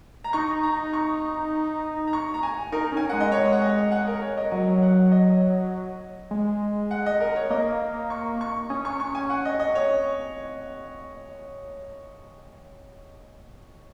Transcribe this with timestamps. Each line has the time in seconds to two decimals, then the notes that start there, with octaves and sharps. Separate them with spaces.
0.24 A#5
0.33 D#4 C#6
0.63 A#5
0.93 C#6
2.07 A#5
2.13 C#6
2.34 A#5
2.43 G#5
2.72 D#4 A#4
2.92 C#4 G#5
3.09 G#3 F#5
3.20 D#5
3.32 G#3 C#5
3.52 F#5
3.62 D#5
3.92 F#5
4.07 A#4
4.22 C#5
4.37 D#5
4.52 F#3 D#5
4.82 F#5
5.11 D#5
6.31 G#3
6.91 F#5
7.06 D#5
7.20 A#4
7.36 C#5
7.50 A#3 D#5
8.10 C#6
8.41 C#6
8.70 C#4 D#6
8.85 C#6
9.00 C#6
9.15 G#5
9.30 F#5
9.45 D#5
9.60 D#5
9.75 C#5